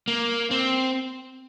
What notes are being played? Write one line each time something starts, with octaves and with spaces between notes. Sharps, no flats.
A#3
C4